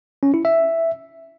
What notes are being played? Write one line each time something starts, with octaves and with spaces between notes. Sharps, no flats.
C#4
E4
E5